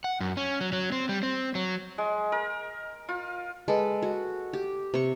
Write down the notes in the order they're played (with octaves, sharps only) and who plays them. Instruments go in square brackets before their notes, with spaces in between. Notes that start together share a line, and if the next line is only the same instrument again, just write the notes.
[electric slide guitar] F#5
F#2
C#4
F#3
F#3
C4
G3
C4
F#3
[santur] G#3
A#4
F4
[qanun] G#3 A4 B4
F#4
G4
C3 C#6